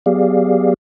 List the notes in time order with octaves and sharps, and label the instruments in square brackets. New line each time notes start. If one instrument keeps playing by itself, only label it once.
[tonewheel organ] F#3 B3 G4 G#4 D5 F5